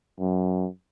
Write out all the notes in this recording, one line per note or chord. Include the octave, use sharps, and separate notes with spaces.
F#2